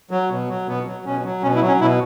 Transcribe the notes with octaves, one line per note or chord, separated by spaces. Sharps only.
F#3
B2
F#3
B2 B3
F#3
B2 C#4
F#3
B2 C#4
E4
F#3
C#4
B2 E4